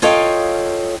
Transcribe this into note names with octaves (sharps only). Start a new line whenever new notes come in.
F4 A4 C#5 D#5 F5 G5